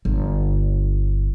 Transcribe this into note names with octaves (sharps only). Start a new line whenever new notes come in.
G1